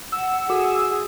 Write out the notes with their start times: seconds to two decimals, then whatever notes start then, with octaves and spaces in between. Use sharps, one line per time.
0.12 F#5 E6
0.50 F#4 G#4 E6